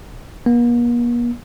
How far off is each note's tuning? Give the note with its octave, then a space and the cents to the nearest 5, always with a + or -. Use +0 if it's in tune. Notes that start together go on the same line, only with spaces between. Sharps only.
A#3 +45